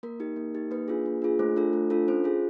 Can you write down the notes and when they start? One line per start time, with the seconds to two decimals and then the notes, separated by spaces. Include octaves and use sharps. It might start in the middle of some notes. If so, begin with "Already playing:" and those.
0.03 A#3 A#4
0.20 D#4 G4
0.36 A#3
0.55 D#4 G4
0.71 A#3 B4
0.88 D4 F4 G#4
1.06 A#3
1.22 D4 F4 G#4
1.39 A3 C5
1.56 D4 F4 A4
1.73 A3
1.90 D4 F4 A4
2.08 C#4 C5
2.24 F4 G#4